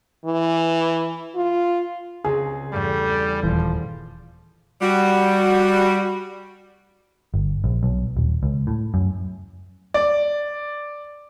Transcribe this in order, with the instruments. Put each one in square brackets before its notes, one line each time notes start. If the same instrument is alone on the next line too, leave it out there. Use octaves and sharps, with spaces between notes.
[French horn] E3
F4
[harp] C#2 C4 [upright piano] G#4
[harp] E2 G2 A3 [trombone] G3
[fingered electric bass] D#1 E3 [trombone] F3
[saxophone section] G3 F#4
[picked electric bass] G1
A#1
B1
D#1
C#2
A2
F#2
[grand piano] D5